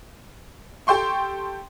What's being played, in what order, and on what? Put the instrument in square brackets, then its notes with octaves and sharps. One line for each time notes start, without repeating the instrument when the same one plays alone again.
[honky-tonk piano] G4 A4 G5 C6 C#6